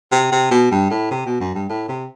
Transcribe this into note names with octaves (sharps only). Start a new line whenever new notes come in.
C3
C3
B2
G2
A2
C3
B2
F#2
G2
A2
C3